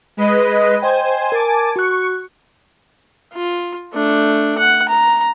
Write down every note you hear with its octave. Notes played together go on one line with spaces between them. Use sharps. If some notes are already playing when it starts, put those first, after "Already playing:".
G#3 B4 D#5
C5 D#5 G5 G#5
A#4 G#5 A5 D6
F#4 C#6 F#6
F4
A3 D4
F#5
A#5